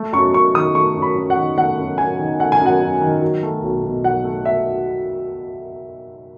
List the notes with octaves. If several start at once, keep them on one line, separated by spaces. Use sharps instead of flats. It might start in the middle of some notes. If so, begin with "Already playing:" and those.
Already playing: A3
F#2 C#6
F#2 C#6
D#3 D#6
A3 C#6
F#2
B5
F#2
F#5
D#3
A3 F#5
F#2
F#2 G#5
D#3
A3 F#5
G#5
F#2
F#5
F#2
D#3
F#3
A3
B1
B2
F#3 F#5
A3
E5